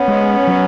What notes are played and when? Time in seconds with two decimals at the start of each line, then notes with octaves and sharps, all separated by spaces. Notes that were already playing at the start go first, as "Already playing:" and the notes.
Already playing: B3 C#4
0.08 G#3
0.48 F#3